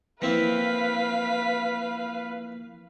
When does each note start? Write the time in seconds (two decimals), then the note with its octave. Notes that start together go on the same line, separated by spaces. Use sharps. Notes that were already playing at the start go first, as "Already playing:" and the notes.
0.22 E3 F3 A#3 C4 E4 B4 F5 B6